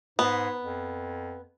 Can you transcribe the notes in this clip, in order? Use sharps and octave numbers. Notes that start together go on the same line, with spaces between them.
G#2 B3
F2